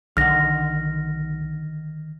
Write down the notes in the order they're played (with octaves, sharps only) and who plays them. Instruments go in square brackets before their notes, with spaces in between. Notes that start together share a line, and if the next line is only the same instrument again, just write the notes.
[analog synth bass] B1 [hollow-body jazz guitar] D3 D#3 F#5 [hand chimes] F6 A#6